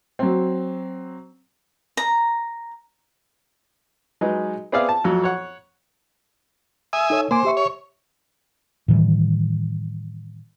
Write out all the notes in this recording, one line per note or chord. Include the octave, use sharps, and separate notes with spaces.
F#3 C4
A#5
F#3 G#3 D#4 B4
B3 C4 G#4 D5 E5 F5
A5
F2 F#3
C#5 F#5
E5 G#5 D#6
D#4 A4 C#5
A#3 C5 G#5 D6
G4 E5 C#6
C#5
A2 D#3 E3 G3